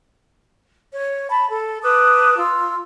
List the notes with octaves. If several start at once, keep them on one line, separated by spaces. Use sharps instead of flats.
C#5
A5 B5
A4
B4 A5 D6 D#6
F4 C6 E6